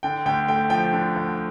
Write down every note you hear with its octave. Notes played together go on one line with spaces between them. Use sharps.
D3 G5
D2 G5
A3 G5
F3 G5
D3
D2